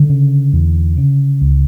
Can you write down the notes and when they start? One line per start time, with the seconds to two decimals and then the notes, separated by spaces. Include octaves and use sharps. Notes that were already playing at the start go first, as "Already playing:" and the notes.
Already playing: D3
0.09 C#3
0.53 E2
0.97 C#3
1.41 C#2